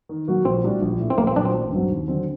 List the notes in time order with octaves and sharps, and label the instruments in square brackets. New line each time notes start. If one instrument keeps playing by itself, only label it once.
[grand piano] D#3
F#3 A#3 F#4
[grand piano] A#1 [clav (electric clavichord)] C4
[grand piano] A2 G3 D4 F#4
A#1
A2 A3
[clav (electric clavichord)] C4
[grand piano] A#1 [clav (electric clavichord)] A#3
[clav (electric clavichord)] C4
[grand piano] A#2 F#3 A#3 F#4 [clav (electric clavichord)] D4
[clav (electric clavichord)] C4
[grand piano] A1
G2 F#3 C4
D#2
D3 F#3 C4